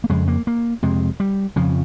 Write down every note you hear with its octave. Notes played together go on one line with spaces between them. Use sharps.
A#3
F2 C#3 G#3
A#3
A#3
F2 C3 G#3
G3
F2 C#3 F3